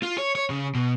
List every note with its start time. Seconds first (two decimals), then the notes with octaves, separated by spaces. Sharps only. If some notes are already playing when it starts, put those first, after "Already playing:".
0.03 F4
0.19 C#5
0.35 C#5
0.50 C#3
0.75 B2